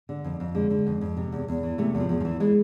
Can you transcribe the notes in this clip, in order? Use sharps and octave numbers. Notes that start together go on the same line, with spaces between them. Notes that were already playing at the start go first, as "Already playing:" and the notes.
D3
F2
F2
D3 G#3
D3
F2
F2
C3
E2
E2
E3
C3 A3
E2
F3
E2
F3
E3
E3 G#3